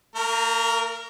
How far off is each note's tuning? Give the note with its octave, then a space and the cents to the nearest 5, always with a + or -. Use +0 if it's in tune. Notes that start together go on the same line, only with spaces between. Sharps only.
A#3 -45 A#4 +0